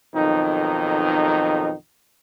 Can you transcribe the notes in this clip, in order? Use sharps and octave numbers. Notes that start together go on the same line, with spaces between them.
B1 F2 D#3 D#4